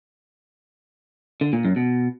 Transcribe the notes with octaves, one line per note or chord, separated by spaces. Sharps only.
D3
A#2
F#2
B2